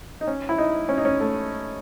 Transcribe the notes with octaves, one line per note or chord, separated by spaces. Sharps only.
D#4
C#4
E4
D#4
C#4
D#4
C#4
A3